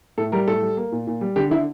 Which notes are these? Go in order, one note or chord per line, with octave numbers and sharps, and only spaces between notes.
A2 A4
G3 A#4
A2 A4
G3
A#3
A#2
A#2
G3
D3 G4
D3 E4